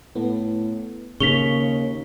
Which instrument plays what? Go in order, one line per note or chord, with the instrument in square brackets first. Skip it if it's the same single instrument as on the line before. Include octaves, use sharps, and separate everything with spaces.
[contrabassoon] A2 [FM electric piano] B3
[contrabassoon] D#2 [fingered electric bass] C#3 [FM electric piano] C#6 [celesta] B6 F7 G7